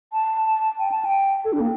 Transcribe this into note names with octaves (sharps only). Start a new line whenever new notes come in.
A5
A5
G5
A5
G5
A4
D4
A#3